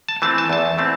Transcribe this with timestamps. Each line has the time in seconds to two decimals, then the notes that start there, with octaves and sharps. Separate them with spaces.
0.09 A5
0.22 E3 A3 C4 A5
0.38 A5
0.50 E2 A5
0.78 E3 A3 C4